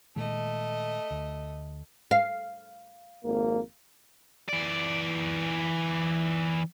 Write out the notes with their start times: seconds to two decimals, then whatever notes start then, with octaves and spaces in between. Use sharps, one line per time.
0.16 A#2 D#3 G#3 A3 D#5
1.11 D2
2.11 F5
3.25 G#1 F2 A#3
4.49 E3 D5